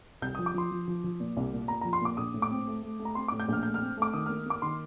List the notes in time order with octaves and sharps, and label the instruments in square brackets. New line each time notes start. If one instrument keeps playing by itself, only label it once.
[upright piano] C2 G6
D#6
F3
D6
F3 C6
F3
F3
F3
A#2
C2
A#2
A#2 A#5
F3 A#5
C6
A#2 D6
A#1 D#6
A2
D6
C4
A3
A3
A3
A#5
C4 C6
A2 D6
G6
A#1 F6
A3 G6
F6
C4
A3 D6
D#3 D#6
A#3 F6
A#3 D6
D#3 C6